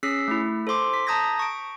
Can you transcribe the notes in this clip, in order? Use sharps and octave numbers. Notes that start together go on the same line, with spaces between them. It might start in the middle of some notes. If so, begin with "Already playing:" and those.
C#4 G#4 E6 B6 C7
A3 E4
A4 C5 C6 D6
B6
A5 A#5 D#6 G6 G#6 A#6
C#6 D7